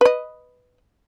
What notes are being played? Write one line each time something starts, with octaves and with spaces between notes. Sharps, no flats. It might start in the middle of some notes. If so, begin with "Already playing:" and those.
B4 D#5